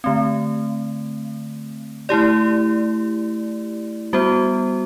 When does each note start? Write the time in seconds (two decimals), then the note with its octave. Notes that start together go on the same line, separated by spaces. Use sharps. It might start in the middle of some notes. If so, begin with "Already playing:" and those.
0.04 D3 A3 C4
2.09 A3 E4 G4 D5
4.13 G3 B3 F#4 C5